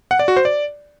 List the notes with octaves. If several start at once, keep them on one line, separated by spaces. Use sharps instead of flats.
F#5
D5
F#4
C5
D5